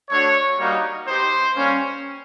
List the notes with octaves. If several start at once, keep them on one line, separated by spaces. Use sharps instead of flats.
A3 D4 F#4 C#5
G3 A#3 D#4 F#4
B3 D#4 G4 C5
G3 A#3 C#4